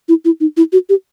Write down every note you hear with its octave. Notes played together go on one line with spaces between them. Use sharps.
E4
E4
D#4
E4
F#4
G4